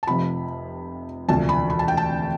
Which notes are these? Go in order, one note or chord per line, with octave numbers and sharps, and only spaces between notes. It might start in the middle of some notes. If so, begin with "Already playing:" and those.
A5
F1 F2 C3 F3 B5
E1 D2 C3 F3 A5
B5
B5
A5
G5
A5